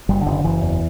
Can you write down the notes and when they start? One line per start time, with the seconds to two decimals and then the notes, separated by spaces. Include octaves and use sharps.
0.09 F#1 G3
0.21 D3
0.26 F#1
0.32 D3
0.44 F#1 E3
0.62 E2